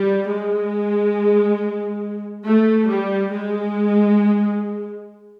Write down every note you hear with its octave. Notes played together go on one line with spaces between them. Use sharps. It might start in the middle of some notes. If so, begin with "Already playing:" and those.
Already playing: G3
G#3
A3
G3
G#3